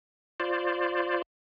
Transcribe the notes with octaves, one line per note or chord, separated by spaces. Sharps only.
F4 C5 D5